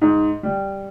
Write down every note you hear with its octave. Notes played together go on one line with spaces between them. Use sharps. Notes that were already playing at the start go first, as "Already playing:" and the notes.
G#2
G3